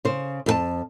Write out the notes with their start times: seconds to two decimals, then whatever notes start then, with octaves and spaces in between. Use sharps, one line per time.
0.05 C#3 C5
0.46 F2 A4 A5